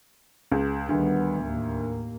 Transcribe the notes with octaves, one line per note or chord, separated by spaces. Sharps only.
C#2
D2 D#3 G3 B3
D#2 A2 A#3